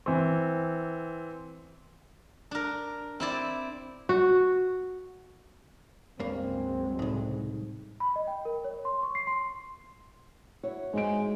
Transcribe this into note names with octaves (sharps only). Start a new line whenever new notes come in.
E3 C4
D4 A#4
C4 E4 D5
F#4
C#2 G2 F#3 G#3 A#3 C4
C2 F2 A2 D#4
B5
D#5
G5
A#4
C#5
C6
C#6
C7
C6
E4 F#4 C#5
G#2 G#3 D7